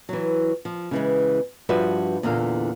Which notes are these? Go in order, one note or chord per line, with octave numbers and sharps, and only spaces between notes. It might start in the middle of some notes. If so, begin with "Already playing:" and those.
E3 F#3
F3
C#3 E3 G#3
G2 F3 F#4 G4 B4 E5
E2 A#2 D3 A#3 F5